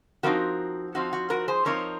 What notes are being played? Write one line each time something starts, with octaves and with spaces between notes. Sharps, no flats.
F3 C4 D#4 F#4 A#4
F3 C4 D#4 F#4
F#4
F#4 A#4
G#4 C5
F3 C4 D#4 A#4 C#5